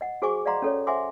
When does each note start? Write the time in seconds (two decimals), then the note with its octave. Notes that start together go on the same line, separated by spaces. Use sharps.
0.01 D#5 F#5
0.22 F#4 G#4 C5 G#5 C#6 D6
0.46 D5 D#5 F5 F#5 A#5 C6
0.62 C#4 A4 C#5
0.87 C5 E5 F#5 G#5 C6 D6